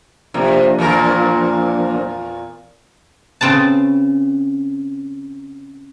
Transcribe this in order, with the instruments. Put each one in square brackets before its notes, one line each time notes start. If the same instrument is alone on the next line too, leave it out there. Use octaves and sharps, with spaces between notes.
[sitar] C3 [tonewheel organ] F3 A#3 D4
[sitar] E2 A#2 A#4
[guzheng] C#3 C4 B4 A5